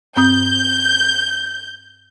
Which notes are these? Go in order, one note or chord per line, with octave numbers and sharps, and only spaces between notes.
G2 C4 D#6 G6